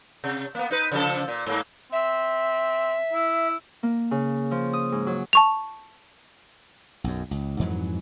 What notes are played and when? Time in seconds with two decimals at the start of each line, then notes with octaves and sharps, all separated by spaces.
0.24 C3
0.55 A#3 B3
0.71 D#4 B4
0.92 C#3 F3 A4
1.28 A#2
1.46 G#2 A#3
1.92 C4 E5
3.13 E4
3.83 A#3
4.11 C#3
4.51 F3
4.73 D#6
4.92 G#2
5.07 F#3
5.33 A5 C#6 F7
7.04 B1 F#2
7.31 C#2
7.59 F2 G#2 E3 F#3